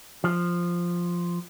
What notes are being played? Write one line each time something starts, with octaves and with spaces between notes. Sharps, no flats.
F3